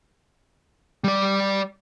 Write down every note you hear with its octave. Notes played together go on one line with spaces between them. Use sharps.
G3 D5